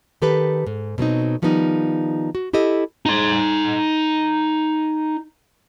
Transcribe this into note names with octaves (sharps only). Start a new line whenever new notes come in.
D#3 G4 A4 B4
G#2
B2 F#3 C4 D#4
D#3 F3 G3 B3 D4 D#4
F#4
E4 G4 A4 D#5
D#4 C6